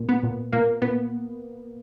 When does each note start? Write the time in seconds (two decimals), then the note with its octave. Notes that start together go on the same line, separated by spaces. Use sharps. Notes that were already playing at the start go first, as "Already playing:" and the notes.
Already playing: A#2
0.09 B3
0.23 A#2
0.52 A#2 A#3
0.82 A#2 B3